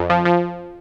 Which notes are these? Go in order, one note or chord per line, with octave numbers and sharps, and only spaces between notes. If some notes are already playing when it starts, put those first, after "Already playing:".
Already playing: F2
F3
F3